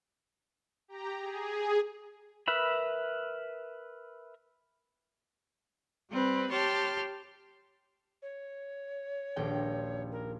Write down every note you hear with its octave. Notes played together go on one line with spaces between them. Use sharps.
G4 A#5
G#4
A#4 B4 E5 B5
G3 C4 B4
G4 C#5 A5 C6 F6
C#5
D#1 A#1 G5
A#4